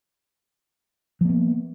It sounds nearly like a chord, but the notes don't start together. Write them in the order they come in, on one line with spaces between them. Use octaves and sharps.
F3 A#3 B3